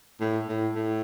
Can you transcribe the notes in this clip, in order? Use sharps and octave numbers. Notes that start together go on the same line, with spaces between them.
A2
A2
A2